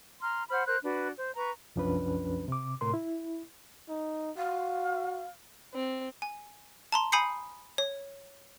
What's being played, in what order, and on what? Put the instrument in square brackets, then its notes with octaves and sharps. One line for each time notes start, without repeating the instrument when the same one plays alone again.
[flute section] A#5 C6 F6
C5 F#5 B5 F6
A#4 C5 F#6
D4 F#4 B4
C5
B4 A#5 C#6
[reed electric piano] C2 F#2 F3 C#4 D4 B4
C3 D6
A2 C3 A#4 C6
E4
[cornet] D#4
[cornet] F#4 [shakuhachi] F5
[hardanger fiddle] C4
[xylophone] G#5
A5 A#5 C6
G#5 B5 D#6 G6 C7 C#7
C#5